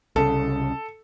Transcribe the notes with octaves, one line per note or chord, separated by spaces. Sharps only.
C2 C#3 A4